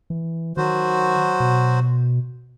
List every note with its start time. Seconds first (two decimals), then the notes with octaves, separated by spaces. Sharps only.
0.10 E3
0.57 D#3 F#3 F#4 C5
1.40 B2